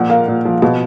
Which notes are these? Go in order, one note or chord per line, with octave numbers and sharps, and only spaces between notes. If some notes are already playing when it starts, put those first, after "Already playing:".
Already playing: A#2 F3 F#5
A#3 F5
A#2
F3
B2 F5